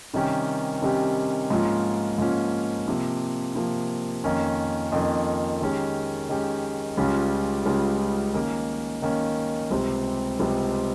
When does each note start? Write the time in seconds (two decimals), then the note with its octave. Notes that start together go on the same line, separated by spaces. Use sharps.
0.14 C3 D#3 G3 C#4 G4
0.82 C3 D#3 G3 C#4 G4
1.50 G#2 F3 A#3 C#4 F4
2.18 G#2 F3 A#3 C#4 F4
2.88 C3 F3 A#3
3.55 C3 F3 A#3
4.24 F2 D#3 A#3 C#4
4.92 F2 D#3 A#3 C#4
5.61 D#3 G#3 C#4 G4
6.29 D#3 G#3 C#4 G4
6.97 C#2 C#3 G3 C#4 F4
7.66 C#2 C#3 G3 C#4 F4
8.34 D#3 A#3 C#4
9.02 D#3 A#3 C#4
9.71 C#2 C3 G3 C4
10.40 C#2 C3 G3 C4